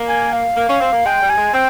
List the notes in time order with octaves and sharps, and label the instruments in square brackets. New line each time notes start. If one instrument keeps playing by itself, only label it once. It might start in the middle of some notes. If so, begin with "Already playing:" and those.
Already playing: [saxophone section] A#3
[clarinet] G#5
F5
[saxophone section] A#3
C#4
C4
A#3
[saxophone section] G#3 [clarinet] G5
[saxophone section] G3
[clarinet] G#5
[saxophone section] G#3
[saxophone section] C4 [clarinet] G5